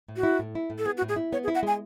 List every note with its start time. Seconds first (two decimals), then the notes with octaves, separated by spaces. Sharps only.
0.08 A2
0.16 F#4
0.23 E4
0.39 A2
0.55 E4
0.70 A2
0.78 A4
0.86 B3 G#4
0.97 F#4
1.02 A2
1.09 G#4
1.16 E4
1.33 B3 C#5
1.44 G#4
1.48 E4
1.55 F#5
1.63 G#3 G#5